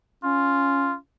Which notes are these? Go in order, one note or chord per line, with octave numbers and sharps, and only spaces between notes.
C#4 F4